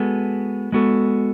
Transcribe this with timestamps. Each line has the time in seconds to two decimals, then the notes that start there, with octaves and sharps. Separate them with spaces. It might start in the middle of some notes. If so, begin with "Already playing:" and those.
Already playing: G#3 B3 F#4 A4
0.72 G#3 B3 F#4 A4